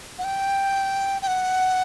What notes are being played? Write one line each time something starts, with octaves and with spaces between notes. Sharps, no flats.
F#5
G5
G5
F#5